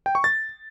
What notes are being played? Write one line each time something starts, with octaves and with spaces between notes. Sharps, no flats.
G5
C#6
A6